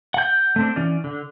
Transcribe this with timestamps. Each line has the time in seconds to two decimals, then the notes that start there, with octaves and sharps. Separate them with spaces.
0.14 F#5 G6
0.56 A3 C4 D4
0.76 E3 C#4 D5
1.04 D3